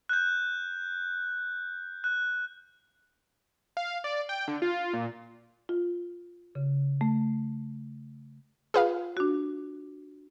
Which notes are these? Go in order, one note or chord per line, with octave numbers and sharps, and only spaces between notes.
F#6 G6
F#6
F5
D5
G5
D3
F4
A#2
F4
C#3
A3
F4 G#4 B4 F5
D4 F#4